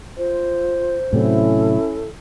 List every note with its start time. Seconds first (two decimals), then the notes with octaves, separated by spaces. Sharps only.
0.17 F4 C5
1.13 A2 C3 F#3 C#4 E4 A4